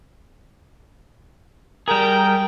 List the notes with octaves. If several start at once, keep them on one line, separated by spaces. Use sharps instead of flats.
G3 G#4 A#4 G5 A#5